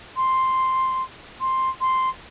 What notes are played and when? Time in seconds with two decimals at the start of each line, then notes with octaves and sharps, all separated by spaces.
0.16 C6
1.40 C6
1.80 C6